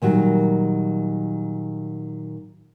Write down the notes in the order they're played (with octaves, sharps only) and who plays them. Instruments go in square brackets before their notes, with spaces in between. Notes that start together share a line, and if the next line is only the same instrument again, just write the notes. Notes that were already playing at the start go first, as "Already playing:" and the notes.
[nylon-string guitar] A#2 D#3 F#3 G3